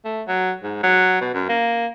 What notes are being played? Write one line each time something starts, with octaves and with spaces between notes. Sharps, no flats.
A3
F#3
G#2
F#3
B2
F#2
A#3